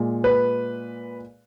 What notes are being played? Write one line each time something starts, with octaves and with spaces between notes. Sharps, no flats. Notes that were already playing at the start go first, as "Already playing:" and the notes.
Already playing: A#2 G#3
B4